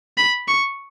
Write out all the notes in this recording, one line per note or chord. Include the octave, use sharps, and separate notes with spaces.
B5
C#6